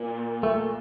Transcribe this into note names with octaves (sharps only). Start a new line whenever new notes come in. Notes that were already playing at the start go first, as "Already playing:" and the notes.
Already playing: A#2
A3